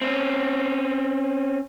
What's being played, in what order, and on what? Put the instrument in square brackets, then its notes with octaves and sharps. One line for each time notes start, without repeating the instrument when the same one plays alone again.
[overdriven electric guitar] C4 C#4